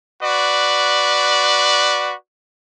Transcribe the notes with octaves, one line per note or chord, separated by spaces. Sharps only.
F#4 B4 D5